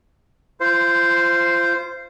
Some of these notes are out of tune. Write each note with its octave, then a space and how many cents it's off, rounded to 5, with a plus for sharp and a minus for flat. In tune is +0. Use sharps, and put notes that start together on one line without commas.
F4 -30 C5 -5